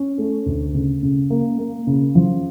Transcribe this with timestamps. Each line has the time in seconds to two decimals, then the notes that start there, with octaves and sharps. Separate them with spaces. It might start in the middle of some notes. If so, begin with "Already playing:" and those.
Already playing: C#4
0.18 A3
0.46 D2
0.74 C#3
1.02 C#3
1.30 A#3
1.58 A#3
1.87 C#3
2.15 F3